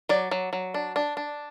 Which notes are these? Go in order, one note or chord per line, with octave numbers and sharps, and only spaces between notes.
F#3 D5
F#3
F#3
D4
D4
D4